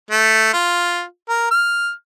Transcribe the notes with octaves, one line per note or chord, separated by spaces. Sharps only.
A3
F4
A#4
F6